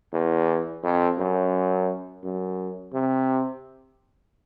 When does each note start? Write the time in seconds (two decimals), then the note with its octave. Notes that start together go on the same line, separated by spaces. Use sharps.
0.13 E2
0.84 F2
1.19 F#2
2.24 F#2
2.93 C3